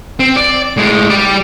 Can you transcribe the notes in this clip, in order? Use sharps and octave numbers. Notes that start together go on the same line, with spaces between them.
C4
D5
A2 G#3
G3 D5